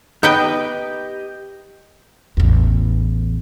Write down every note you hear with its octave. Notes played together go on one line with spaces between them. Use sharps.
B3 D#4 G4 B4 D#5 G5 D#6
A1 E2